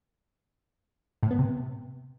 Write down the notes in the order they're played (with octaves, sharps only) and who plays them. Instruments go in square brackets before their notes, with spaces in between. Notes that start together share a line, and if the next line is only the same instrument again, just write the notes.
[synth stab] A2
B3
C3